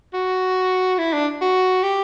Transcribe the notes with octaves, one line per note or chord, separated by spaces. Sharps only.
F#4
E4
D4
F#4
G4